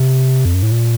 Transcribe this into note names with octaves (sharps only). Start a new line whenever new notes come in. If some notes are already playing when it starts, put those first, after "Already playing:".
Already playing: C3
F2
F#2
A2
A#2